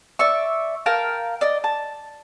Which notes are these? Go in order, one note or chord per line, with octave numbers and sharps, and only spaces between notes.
D5 E5 C#6
A#4 F5 G5 A5
D5 D#5
A5